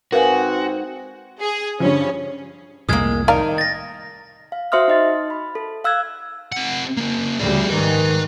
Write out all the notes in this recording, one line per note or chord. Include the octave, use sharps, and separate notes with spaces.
G#2 C4 F#4 A#4 B4 F5 F#5
G#4
G2 D3 F3 C#4
C2 F2 A2 G#3 A#3 D#6 F6 G#6
D#3 D5 F5 A#5
A6 A#6
F5
F#4 C5 E5 C6 D#6 F6
D#4 D#5 A6
B5
A4
F5 E6 F#6 G#6
C3 F#5
C#3 A#3
D2 C#3 G3 G#4 D5
G#2 D#3 B4 G#5